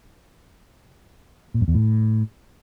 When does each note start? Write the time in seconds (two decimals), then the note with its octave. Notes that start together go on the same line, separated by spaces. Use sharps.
1.54 A#2
1.61 F#2
1.68 E2
1.74 A2